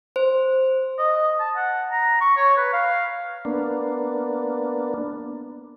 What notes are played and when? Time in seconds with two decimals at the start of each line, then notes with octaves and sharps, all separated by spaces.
0.16 C5
0.99 D#5
1.40 A5
1.56 F#5
1.91 A#5
2.21 C#6
2.37 C#5
2.57 B4
2.73 F5
3.45 A#3 B3 D4